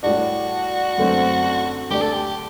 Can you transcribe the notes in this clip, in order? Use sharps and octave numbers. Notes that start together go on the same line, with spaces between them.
A2 G3 D4 F#4
F#2 D3 A3 C4
D2 D3 A3 D4 G4
A4
G4